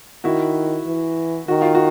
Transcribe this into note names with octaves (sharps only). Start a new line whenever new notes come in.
D#3 E4 F#4
E3
D#3 F#4
F4
F#4